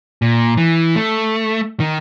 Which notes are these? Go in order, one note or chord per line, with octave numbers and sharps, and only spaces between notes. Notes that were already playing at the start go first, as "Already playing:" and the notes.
A#2
E3
A3
D#3